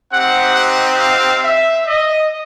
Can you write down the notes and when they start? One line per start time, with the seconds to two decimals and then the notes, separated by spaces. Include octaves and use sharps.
0.11 C4 D#4 G4 F#5
0.55 F#5
0.99 F5
1.43 E5
1.87 D#5